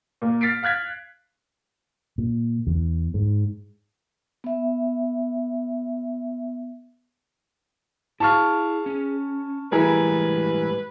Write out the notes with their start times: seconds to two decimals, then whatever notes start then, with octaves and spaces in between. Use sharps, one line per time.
0.22 A#2 A#3
0.41 F6 A6 B6 C7 D7
0.63 F5 F6 F#6 G#6 B6
2.18 A#2
2.67 E2
3.14 G#2
4.44 B3 E5
8.20 E4 G#4 F5 A5 C#6 F6
8.86 C#4
9.72 A2 E3 G3 G#3 E4 G#4 A#4 B4